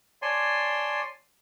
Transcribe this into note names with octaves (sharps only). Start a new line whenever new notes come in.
C#5 D5 G#5 A5 C6